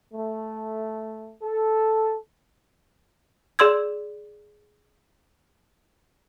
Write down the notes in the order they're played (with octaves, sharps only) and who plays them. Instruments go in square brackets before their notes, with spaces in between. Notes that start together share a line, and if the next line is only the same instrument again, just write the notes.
[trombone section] A3
A4
[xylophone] G#4 D5 C6 E6 G#6